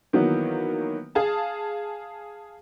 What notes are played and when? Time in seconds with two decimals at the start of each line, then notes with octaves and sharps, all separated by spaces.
0.13 D#3 E3 F#3 A#3 B3
1.15 G#4 F5 A5